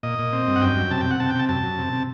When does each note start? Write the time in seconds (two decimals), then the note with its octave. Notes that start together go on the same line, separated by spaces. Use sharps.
0.03 A#2 D#5
0.19 A#2
0.33 C4
0.47 G2
0.56 F#5
0.62 F#2 G5
0.77 F#2
0.91 C3 A5
1.01 G5
1.06 C3 F#5
1.20 C3 A5
1.30 G5
1.35 C3 A5
1.49 F#2 A5
1.63 F#2
1.79 C3
1.93 C3